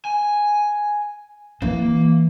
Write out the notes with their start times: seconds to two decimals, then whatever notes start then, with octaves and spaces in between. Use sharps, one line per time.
0.05 G#5
1.62 E3 A#3